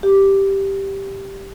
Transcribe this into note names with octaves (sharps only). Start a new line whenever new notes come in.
G4